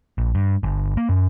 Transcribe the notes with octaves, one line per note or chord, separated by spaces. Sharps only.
A#1
G2
G1
A#3
F#2